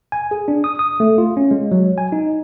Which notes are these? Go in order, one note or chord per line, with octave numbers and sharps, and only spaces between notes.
G#5
G#4
D4
D#6
D#6
A3
F4
C#4
G#3
F#3
G#5
D#4